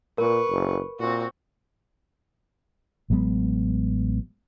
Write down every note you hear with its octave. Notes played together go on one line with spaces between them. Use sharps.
A#2 A#4 B4 C#6
F#1
A#2 C4 F#4
A1 F#3 G#3 B3